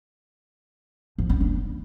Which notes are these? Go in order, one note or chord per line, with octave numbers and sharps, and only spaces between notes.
F3
C#4
D4